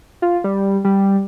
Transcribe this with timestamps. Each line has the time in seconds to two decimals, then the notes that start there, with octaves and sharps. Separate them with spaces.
0.22 F4
0.44 G3
0.85 G3